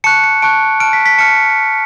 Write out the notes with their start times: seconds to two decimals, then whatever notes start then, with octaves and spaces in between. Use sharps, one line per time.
0.04 A5 C#6 F#6 C#7
0.24 C#7
0.42 A5 C#6 F#6 D7
0.80 A5 F6 D7
0.93 B6
1.06 B6
1.18 A5 F6 C#7